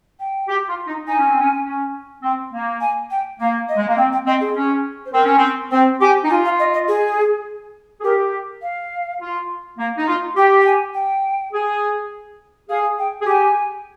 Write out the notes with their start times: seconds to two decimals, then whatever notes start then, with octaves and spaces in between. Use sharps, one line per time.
0.20 G5
0.48 G4
0.68 F4
0.87 D#4
1.07 D#4 G#5
1.18 C#4
1.29 C4
1.40 C#4
1.65 C#4
2.23 C4
2.53 A#3
2.81 G#5
3.11 G5
3.40 A#3 F5
3.69 D#5
3.77 G#3
3.88 A#3
3.97 C4 G5
4.13 G5
4.26 C4 D#5
4.41 G#4
4.55 C#4
5.06 C5
5.13 C4 A#4
5.25 C#4
5.38 C4
5.71 C4 C5
6.01 G4 G#5
6.24 D#4
6.30 F4 G#5
6.45 F5
6.59 D#5
6.74 D#5
6.88 G#4
8.00 G#4
8.04 G4 A#4
8.62 F5
9.21 F4
9.78 A#3
9.97 D#4
10.07 F4
10.37 G4 G5
10.61 G5
10.66 G#5
10.94 G5
11.53 G#4
12.69 G#4 F5
12.99 G5
13.21 G#4
13.27 G4 G#5